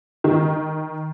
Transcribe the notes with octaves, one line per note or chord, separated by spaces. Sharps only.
D#3